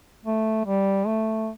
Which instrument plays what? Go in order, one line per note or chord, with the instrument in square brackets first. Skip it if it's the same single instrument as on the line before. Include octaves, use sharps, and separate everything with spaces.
[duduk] A3
G3
A3